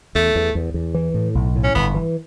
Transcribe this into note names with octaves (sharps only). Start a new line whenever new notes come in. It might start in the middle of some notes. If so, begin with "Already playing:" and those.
E2 A3
E2
E2
E2
E3
A2
B1
A2
C#4
G1 B3
E3